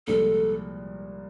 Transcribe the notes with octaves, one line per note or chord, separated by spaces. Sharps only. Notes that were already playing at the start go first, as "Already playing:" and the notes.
C2 A#2 F3 G#3 A4